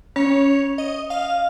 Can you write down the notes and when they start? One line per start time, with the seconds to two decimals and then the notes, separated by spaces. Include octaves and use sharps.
0.16 C#4 C#5
0.78 D#5
1.10 F5